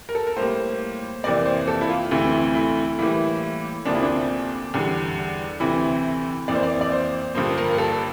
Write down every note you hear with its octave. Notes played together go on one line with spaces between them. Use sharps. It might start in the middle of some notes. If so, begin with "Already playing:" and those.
A#4
A4
A#4
A2 G3 A#3 C5
F2 C3 E3 A#3 D5
C5
A4
E4
F4
D2 C3 E3 A3 E4
E4
A2 E3 G3 A#3 E4
D2 C3 F3 A#3 D4
E4
D4
E2 D3 G3
D2 C3 E3 E4
F2 E3 A#3 D5
C5
D5
D5
C5
G2 D3 F3 A#3 C5
A#4
A4